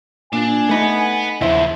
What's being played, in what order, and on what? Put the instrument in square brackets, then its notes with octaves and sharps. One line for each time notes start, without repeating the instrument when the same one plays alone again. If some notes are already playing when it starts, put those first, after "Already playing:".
[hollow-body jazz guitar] A#2 [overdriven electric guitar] D4 [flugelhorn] G#5
[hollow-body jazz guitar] A3 D#4 [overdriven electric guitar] F#5 B5
[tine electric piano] D#2 E5 [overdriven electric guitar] C#3 F3 [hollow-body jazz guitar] E4 C5